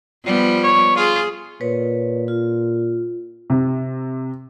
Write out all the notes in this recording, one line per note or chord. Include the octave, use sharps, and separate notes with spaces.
F3 G3 B3
C#5
F4 G#4
A#2 B4 C#5
F4
C3